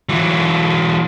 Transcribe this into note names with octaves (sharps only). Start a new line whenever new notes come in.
E3 F#3